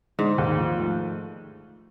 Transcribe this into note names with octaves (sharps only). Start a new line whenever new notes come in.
G#2 D3
D#2
F3
A3